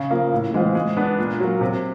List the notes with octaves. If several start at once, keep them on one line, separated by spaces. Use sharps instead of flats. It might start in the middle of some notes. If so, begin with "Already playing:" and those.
Already playing: C#3
F3 A#3
A2
E3 G#3 C4 F4
G#3
B3 D4
A#2
F#3 A#3
C3